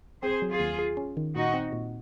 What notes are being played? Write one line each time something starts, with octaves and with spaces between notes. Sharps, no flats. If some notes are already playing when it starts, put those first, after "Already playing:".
C4 G#4 C5
F#3
F4 G#4
D#2
G#4
C#4
D#3
A#2 D#4 F#4
C4
A#2